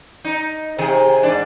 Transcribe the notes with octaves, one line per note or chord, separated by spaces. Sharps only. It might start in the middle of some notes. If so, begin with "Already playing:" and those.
D#4
C3 D#3 G#4
G#2 D4